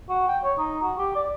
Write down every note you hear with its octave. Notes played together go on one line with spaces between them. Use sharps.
F#4
G5
C#5
D#4
F#4
G4
D5